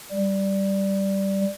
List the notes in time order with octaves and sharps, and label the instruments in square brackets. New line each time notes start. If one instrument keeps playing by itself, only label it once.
[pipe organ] G3